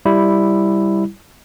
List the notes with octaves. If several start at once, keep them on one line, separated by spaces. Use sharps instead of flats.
G3 E4